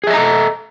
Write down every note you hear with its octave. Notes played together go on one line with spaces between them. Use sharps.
G#4 A4 D#5 E5 A#5